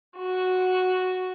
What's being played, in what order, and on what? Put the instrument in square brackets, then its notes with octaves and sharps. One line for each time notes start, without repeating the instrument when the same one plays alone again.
[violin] F#4